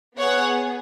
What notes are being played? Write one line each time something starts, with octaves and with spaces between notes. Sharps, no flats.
B3 G#4 C#5 F#5